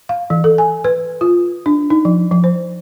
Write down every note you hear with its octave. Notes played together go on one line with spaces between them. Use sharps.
F5
E3
A4
G#5
B4
F4
D4
D#4
F3
F3
C5